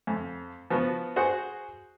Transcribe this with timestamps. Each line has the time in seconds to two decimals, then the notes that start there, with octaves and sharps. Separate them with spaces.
0.07 F2
0.70 F3 B3 F#4
1.16 F#4 G#4 C5 F#5